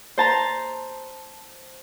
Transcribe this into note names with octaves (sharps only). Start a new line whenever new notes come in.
C5 A5 A#5